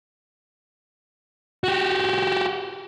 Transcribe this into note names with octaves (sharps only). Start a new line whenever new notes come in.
F#4 G4